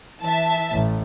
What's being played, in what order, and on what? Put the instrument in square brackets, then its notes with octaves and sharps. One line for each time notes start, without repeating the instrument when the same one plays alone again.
[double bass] E3 [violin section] E5 A5
[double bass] A1